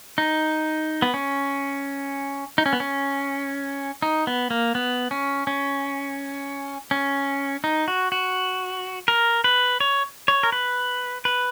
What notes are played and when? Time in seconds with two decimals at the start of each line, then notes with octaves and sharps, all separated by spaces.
0.18 D#4
1.02 B3
1.14 C#4
2.58 D#4
2.66 C#4
2.73 B3
2.80 C#4
4.02 D#4
4.27 B3
4.51 A#3
4.75 B3
5.11 C#4
5.47 C#4
6.91 C#4
7.64 D#4
7.88 F#4
8.12 F#4
9.08 A#4
9.44 B4
9.80 C#5
10.28 C#5
10.43 A#4
10.52 B4
11.25 B4